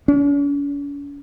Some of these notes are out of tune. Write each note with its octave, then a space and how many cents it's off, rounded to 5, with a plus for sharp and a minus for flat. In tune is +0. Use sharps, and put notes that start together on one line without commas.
C#4 +45